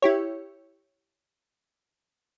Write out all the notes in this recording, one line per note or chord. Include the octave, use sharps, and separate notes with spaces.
E4 G4 C#5